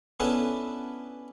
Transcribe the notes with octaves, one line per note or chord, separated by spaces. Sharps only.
B3 C#4 D4 E4 A4 A5